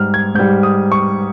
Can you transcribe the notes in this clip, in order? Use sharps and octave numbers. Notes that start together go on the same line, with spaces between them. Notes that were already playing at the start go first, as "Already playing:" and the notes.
Already playing: G#2 G3 F6
G#6
G#2 G3 G6
D#6
C#6